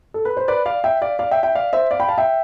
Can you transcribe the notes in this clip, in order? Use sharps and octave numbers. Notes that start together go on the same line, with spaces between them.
A4
B4
C5
B4 D5
D5 F5
E5 G5
D5 F5
D5 F5
E5 G5
E5 G5
D5 F5
C5 E5
D5 F5
G5 B5
F5 A5
E5 G5